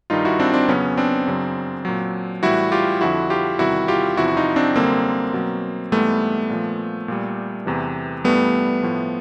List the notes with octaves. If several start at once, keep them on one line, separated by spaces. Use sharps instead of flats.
G2 D#3 G3 D#4 F4
E4 F#4
C4 D4
C4 D4
F2 C#3 F#3 B3 C#4
C4 D4
F#2 C#3 F#3
A#2 F#3
A2 E3 G3 E4 F#4
F4 G4
F2 D3 F3 E4 F#4
F4 G4
E2 C3 D#3 G3 E4 F#4
F4 G4
E2 C3 F3 E4 F#4
F#4
D#4 F4
C4 D4
F#2 D3 G3 A#3 C4
B2 F#3
G#2 E3 G3 A3 B3
A#2 F3
A#2 G3
E2 C3 E3
G2 E3 G3 A3 B3
A2 F3